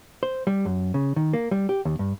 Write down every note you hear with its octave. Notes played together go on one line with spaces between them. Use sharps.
C5
G3
F#2
C#3
D#3
A#3
G3
G4
D#2
G2